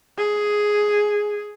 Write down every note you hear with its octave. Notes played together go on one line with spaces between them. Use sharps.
G#4